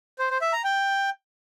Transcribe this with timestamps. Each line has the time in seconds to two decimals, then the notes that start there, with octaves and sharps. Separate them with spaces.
0.19 C5
0.30 C5
0.41 E5
0.53 A#5
0.64 G5